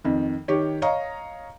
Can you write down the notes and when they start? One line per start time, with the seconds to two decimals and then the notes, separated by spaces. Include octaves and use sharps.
0.04 F2 D#3
0.48 D#3 G4 C#5
0.82 C#5 D#5 F5 A#5